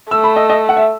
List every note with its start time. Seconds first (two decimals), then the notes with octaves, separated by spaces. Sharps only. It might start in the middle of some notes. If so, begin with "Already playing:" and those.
0.11 A3 E6
0.24 B5
0.36 D#5
0.49 D#5
0.69 F#5
0.77 E5